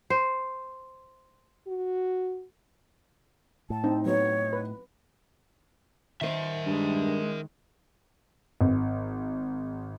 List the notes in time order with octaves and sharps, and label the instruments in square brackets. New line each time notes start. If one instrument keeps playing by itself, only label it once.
[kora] C5
[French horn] F#4
[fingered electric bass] A2 [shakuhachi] A5
[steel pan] C4 [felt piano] D#4
[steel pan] F#3 B3 [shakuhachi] C#5
[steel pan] B4
[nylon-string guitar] D#3 C5 [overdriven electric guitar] A#4 E5
[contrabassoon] G2 [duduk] G#3
[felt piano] G#1